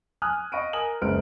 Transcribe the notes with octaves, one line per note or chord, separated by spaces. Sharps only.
G#5 D#6 F6 F#6
D#5 F5 B5 C#6 D7 D#7
A#4 G#5 D#6 F#7
F#1 C#2 B4 C5 F6 D7